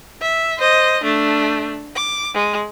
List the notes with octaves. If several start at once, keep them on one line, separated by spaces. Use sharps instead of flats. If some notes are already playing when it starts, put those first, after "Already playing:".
E5
C5 D#5
A3 D4
D6
G#3